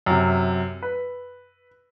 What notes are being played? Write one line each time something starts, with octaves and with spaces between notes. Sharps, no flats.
F#2 C3
B4